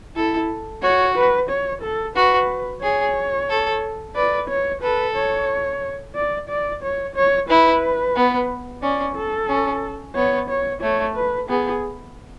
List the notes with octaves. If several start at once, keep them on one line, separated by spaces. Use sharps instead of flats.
E4 A4
F#4 C#5
B4
C#5
A4
F#4 B4
G#4 C#5
A4
B4 D5
C#5
A4 B4
C#5
D5
D5
C#5
C#5
E4 B4
B3
C#4 D5
A4
C#4
B3 C#5
C#5
A3 C#5
B4
B3 G#4